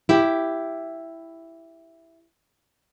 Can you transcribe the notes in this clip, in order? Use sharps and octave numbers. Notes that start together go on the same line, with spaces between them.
E4 G4